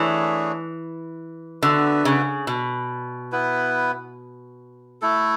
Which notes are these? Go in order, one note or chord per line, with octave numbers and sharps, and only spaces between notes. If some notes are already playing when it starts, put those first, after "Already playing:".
Already playing: E3 A3 D4 G#4 C#5
D3 B3 F#4 B4 E5
C#3
B2
B3 E4 B4
A3 E4 A4